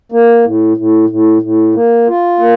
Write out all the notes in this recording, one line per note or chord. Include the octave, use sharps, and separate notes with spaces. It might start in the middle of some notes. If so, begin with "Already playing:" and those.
A#3
A2
A2
A2
A2
A#3
F4
A#3